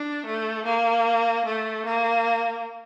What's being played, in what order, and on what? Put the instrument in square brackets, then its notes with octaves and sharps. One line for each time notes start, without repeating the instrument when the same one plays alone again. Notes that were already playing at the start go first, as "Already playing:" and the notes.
Already playing: [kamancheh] D4
A3
A#3
A3
A#3